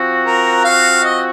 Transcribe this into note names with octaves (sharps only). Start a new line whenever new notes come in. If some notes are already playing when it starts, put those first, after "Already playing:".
Already playing: F3 C4 F#4
A#4
F5
D#5